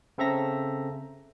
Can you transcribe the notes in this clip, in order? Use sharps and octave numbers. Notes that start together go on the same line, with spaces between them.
C#3 C4 A4 E5 A#5 A#6